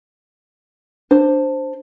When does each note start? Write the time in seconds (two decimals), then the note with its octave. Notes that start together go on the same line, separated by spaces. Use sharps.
1.11 D4 C5